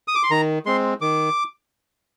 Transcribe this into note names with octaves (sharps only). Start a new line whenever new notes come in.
D#6
D6
C6
D#3 A#5
G#3 C4 C6
D#3 D6